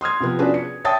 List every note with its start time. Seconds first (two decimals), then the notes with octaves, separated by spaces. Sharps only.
0.01 C6 D#6 F6 G#6
0.20 C3 F3 B3
0.39 C#4 D4 F4 F#4 G#4 B4
0.54 C#7
0.84 C#5 E5 G5 A5 D#6 A6